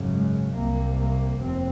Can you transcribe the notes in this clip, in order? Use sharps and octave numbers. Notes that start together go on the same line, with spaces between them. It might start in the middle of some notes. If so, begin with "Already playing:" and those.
Already playing: G#1 F#2 C#3
G#3
C2 C3 A#3
A#3
F1 D#2 C4